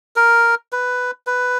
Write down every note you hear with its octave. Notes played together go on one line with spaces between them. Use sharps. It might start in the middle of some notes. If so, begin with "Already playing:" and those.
A#4
B4
B4